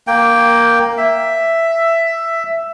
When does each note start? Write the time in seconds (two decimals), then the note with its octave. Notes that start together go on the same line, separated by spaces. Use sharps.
0.07 A#3 G5
0.98 E5